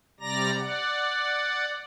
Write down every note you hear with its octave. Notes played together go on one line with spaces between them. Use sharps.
C3 G3 D5 A#5 A#6
D5 F#5